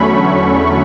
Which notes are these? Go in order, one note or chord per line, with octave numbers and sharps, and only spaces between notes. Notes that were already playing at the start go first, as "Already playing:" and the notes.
Already playing: E2 D3 F#3 A3 C#4 B5 C#6